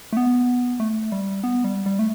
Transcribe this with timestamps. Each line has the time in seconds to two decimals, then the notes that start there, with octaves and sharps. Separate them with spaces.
0.13 A3
0.17 B3
0.80 A3
1.12 G3
1.44 B3
1.64 G3
1.86 G3
1.99 A3